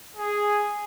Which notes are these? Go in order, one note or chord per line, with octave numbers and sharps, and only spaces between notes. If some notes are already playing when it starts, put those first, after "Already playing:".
G#4